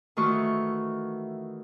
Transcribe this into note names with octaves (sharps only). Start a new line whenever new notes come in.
D#3 E3 A3 F4 F#4 C#6